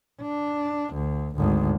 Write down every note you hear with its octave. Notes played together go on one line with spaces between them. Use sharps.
D4
D2
G#1 D2